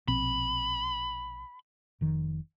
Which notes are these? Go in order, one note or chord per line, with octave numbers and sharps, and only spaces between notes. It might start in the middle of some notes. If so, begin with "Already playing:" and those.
A#1 B2 C4 B5
F1 D#3